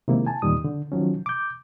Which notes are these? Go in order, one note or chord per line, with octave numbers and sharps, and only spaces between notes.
C3 D#3 G#3 A#3 E4
G#5 A5
E2 A#2 D#3 G3 D#6
D3
D#3 F3 F#3 C#4
D6 G6